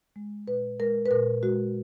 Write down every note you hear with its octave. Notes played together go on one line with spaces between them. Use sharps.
G#3
A#2 B4
G#3 A#4
B4
A#2 A#4
G#3 F#4